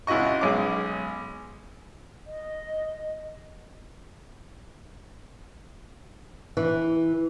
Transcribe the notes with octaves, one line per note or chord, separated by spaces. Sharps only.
C#2 E4 F#4 D#5 C#6
B1 G#3 C#4 D6
D#5
E3